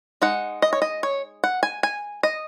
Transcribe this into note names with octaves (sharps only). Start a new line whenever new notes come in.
G#3 D#4 F#5
D#5
C#5
D#5
C#5
F#5
G#5
G#5
D#5